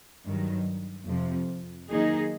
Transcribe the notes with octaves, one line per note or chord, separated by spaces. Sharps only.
G2 D#3 F#3
F2 C3 F3
D#3 F#3 A#3 D#4 G#4